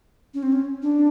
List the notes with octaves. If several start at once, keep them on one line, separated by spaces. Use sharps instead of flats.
C#4
C4
C#4
D4